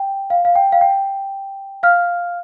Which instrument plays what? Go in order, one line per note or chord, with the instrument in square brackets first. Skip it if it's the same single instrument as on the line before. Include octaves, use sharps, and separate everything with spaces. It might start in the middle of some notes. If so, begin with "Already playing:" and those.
Already playing: [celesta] G5
F5
F5
G5
F5
G5
F5 F6